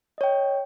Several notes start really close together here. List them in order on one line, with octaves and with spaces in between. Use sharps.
D#5 C#5 G5